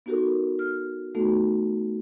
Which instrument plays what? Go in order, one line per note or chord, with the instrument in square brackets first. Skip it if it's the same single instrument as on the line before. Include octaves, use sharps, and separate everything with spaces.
[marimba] B3 D#4 F#4 G4 A4 A#4
F6
A3 B3 D#4 F#4 A4